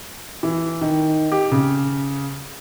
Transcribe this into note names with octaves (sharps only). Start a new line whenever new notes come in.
E3
D#3
G4
C#3